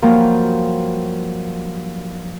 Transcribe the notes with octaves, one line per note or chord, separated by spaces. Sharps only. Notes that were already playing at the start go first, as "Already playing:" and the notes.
G2 F3 F#3 A#3 A#4